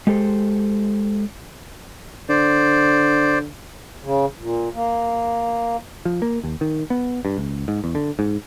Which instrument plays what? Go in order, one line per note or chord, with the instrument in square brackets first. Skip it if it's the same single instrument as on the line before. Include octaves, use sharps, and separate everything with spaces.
[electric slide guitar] G#3 G4 A4 C5
[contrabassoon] D3 [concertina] C5 D5
[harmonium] C#3
A#2
A#3
[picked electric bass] F3
A#3
D#2
D#3
B3
G2
C#2
G#2
E2
D3
G#2